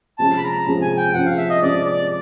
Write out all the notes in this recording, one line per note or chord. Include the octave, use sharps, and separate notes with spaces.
C3 F3 G#3 C#4 A5
B5
A#5
C3 F3 G#3 C#4
G#5
G5
C3 F3 G#3 C#4 F#5
F5
E5
D#5
C3 F3 G#3 C#4 D5
D5